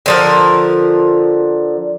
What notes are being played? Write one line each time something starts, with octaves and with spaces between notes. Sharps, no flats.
D3 F3 A#4